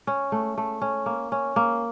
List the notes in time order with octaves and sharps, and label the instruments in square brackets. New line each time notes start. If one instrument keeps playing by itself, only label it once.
[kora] C#4
A3
A3
C#4
A#3
C#4
A#3